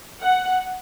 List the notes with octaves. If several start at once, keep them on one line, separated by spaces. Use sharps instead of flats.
F#5